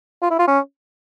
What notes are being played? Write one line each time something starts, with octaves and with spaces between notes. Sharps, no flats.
F4
E4
F4
C#4